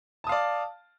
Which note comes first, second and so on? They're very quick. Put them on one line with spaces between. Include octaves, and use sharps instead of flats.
A5 D#6 F5 D5